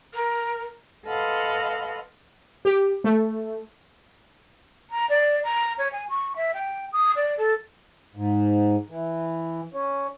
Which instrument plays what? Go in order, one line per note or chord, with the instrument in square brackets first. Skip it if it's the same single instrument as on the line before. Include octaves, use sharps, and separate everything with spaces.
[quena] A#4
[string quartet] A4 B4 D#5 F5 F#5 C6
[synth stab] G4
A3
[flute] A#5
D5
A#5
C#5
G#5
C#6
E5
G5
D#6
D5
A4
[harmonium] G#2
E3
C#4